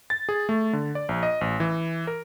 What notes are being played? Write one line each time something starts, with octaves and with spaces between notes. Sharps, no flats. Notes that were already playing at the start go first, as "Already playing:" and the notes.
A6
G#4
A3
D3
D5
A#1
D#5
A1
E3
A#4